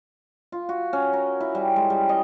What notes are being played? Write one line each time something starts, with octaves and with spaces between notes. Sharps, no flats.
F4
F#4
C#4
A#4
E4
G3
G#3
G3
D#5